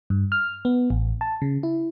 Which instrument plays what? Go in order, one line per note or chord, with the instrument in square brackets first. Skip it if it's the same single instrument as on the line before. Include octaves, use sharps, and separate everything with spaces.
[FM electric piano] G2
F6
B3
A1
A5
C#3
E4